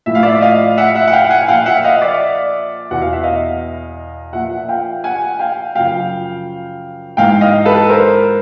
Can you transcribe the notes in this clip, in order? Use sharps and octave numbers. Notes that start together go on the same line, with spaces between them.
A2 F3 E5
F5
D5 E5
D#5 F5
E5 F#5
E5 F#5
F#5
F5 G5
F#5 G#5
A#2 F3 F5 G5
E5 F#5
D#5 F5
D5 E5
E2 B2 F#5
F5
E5
D#5 F5
A#2 F3 E5 F#5
F5 G5
F#5 G#5
F5 G5
F#2 C#3 F3 F5 G5
G#2 E3 F5 G5
D#5 F5
A4 B4
A#4 C5